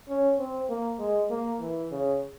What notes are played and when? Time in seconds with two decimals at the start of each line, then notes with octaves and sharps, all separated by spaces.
0.09 C#4
0.39 C4
0.69 A#3
0.99 G#3
1.30 A#3
1.61 E3
1.92 C#3